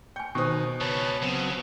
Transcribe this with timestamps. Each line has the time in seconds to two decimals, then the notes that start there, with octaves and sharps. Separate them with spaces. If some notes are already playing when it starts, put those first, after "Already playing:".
0.16 G5 G#5 G6
0.35 B2 D#3 C5 C#6 D#6
0.81 C#2 B4 C#5 A5
1.22 C#3 F#3 B3 C4